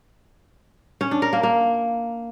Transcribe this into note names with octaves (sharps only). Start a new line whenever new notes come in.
C#4
D4
A#4
A#3
A#3